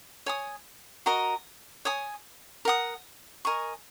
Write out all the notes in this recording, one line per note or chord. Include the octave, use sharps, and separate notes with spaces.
C#5 G#5 D#6
F#4 A#4 D#5 A#5
C#5 G#5 D#6
A#4 F#5 D#6
A#4 D#5 G#5 C#6